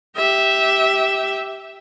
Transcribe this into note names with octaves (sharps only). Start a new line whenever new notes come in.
G4 E5